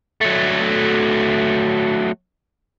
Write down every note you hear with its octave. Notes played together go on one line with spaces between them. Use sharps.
F#3 A3